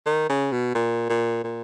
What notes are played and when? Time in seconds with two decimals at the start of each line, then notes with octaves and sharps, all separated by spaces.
0.06 D#3
0.29 C#3
0.52 B2
0.75 A#2
1.09 A#2
1.44 A#2